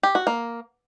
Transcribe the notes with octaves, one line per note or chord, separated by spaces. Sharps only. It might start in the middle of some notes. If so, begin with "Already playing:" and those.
G4
F#4
A#3